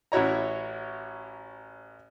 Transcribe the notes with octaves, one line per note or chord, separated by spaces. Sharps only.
A1 E4 F#4 C#5 A#5